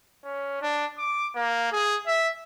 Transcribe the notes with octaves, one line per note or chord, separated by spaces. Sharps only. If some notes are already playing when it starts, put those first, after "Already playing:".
C#4
D4
D6
A#3
G#4
E5